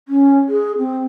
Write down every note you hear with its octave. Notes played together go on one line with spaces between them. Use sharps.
C#4
G#4
C4